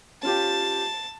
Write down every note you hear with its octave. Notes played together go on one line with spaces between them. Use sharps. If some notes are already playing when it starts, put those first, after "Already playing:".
C#4 F4 G4 A5